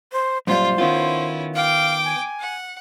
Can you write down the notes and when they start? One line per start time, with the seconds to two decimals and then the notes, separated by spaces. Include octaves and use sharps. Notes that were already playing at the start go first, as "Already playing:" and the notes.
0.12 C5
0.47 F#2 A#2 G3 F4 C5
0.78 D#3 B3 C#4 E4 F4
1.55 F5 G5 D6
2.05 G#5
2.40 F#5